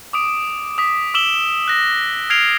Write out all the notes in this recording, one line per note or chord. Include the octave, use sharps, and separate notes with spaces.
D6 D#6 D7
D#6 B6
D6 E6 E7 F#7 G7
F#6 A#6
F6 G#6 C7 D7 F7 G7